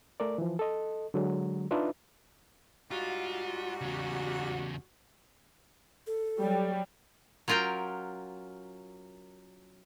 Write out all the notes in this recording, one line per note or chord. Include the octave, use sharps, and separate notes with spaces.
A3 A#4 D5
E3 F3
A4 D#5
D3 F#3 G#3
D4 D#4 F4 B4 E5
G#2 G3 F4 F#4
E2 C#3
A4
F#3 G3
F#3 C#4 F4 A#4 G5